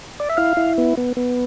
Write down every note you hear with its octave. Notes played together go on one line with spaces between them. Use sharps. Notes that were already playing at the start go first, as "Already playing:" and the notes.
D5
E5
E4 F5
E4
B3
B3
B3